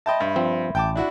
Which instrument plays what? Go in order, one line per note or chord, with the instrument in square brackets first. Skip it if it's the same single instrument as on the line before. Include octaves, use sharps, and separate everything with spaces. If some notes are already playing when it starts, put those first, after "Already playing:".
[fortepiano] D#5 G5 A5 [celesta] E5 B5 C6
[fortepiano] G2
[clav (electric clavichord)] F3 C4
[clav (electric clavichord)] A1 [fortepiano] G5 A5 D6
[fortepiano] D4 E4 F#4